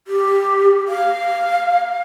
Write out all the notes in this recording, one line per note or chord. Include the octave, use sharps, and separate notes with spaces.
G4
F5